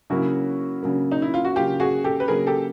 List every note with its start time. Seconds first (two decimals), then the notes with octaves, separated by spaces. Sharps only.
0.10 C#3 F#3 A#3 E4 F#4
0.83 C#3 F#3 A#3
1.12 D#4
1.22 E4
1.34 F4
1.45 F#4
1.55 C#3 F#3 A#3 F4 G4
1.80 F#4 G#4
2.04 G4 A4
2.20 B4
2.28 C#3 F#3 A#3 G#4 A#4
2.47 G4 A4